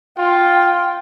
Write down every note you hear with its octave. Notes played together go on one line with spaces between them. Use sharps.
F4 G5